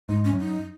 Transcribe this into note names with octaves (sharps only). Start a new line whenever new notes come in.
G#2 D#4
C#4
F#2
D#4